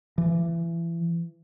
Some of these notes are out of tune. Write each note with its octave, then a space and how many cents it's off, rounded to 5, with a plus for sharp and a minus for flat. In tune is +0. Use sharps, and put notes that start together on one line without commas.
E3 +30